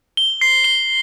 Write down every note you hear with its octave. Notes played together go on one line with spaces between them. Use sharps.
G7
C7
G7